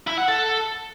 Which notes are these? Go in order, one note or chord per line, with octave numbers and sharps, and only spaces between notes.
E4
F#5
A4